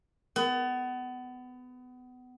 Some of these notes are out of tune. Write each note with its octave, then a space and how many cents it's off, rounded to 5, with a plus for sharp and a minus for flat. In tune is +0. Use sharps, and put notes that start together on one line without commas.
B3 +25